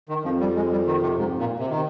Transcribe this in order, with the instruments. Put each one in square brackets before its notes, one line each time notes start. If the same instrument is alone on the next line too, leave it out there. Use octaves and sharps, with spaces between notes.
[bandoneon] D#3
[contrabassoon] F2 [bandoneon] F3
[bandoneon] G3
G#3
G3
D#3
C3
G#2
A#2
C3
D#3